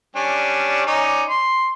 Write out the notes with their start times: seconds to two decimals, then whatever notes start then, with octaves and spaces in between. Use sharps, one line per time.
0.16 G3 C#4 D4
0.87 C#4 D#4 D5
1.29 C6